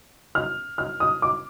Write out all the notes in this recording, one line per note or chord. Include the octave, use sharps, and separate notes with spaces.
F6
F6
D#6
D6